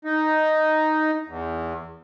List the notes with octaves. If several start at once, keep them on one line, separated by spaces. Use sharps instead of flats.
D#4
E2